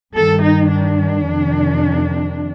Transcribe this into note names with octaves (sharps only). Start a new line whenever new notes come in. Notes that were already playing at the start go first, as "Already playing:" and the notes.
G2 D#3 A4
D#4
D4
F2 C3 D#3